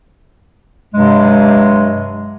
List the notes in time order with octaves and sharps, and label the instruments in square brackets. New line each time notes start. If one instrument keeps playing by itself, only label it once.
[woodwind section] G2 C3 F#3 G#3